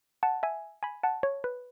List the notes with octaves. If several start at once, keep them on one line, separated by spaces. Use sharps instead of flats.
F#5 A5
E5 G#5
G#5 B5
F#5 A5
C#5
B4